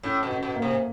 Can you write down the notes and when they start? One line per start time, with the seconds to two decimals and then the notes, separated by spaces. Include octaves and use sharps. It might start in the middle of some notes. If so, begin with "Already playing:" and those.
0.03 A2 C#4
0.23 B2
0.29 C#4
0.43 B2
0.56 A#3
0.62 C3